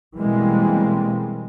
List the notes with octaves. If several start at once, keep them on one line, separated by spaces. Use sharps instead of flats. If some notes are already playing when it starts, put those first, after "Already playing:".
B2 E3 G3 G#3 A#3 C4